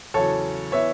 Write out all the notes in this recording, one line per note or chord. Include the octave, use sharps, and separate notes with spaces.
E2 C#3 F#3 A4 C#5
E3 B3 C#5 E5